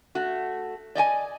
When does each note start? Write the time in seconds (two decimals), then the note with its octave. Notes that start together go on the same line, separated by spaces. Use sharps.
0.15 A3 F#4
0.95 D5 D#5 G5 G#5